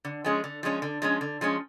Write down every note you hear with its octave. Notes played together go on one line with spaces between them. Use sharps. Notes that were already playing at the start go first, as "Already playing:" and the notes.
D3
F3 G#3 C#4
D3
F3 G#3 C#4
D3
F3 G#3 C#4
D3
F3 G#3 C#4